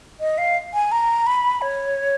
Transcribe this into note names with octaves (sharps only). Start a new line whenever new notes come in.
D#5
F5
G#5
A#5
B5
C#5